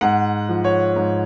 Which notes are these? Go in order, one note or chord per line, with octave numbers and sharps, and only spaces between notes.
G#2 F#5
F3
C#5
G#2